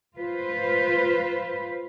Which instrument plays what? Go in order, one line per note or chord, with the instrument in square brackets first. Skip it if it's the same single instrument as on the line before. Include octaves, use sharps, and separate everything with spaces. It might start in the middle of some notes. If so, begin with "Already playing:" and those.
[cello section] F4 B4 C5